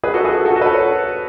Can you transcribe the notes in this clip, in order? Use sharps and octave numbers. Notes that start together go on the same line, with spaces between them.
G#4 B4
F#4 A4
G#4 B4
F#4 A4
F#4 A4
F#4 A4
B4
A4 C#5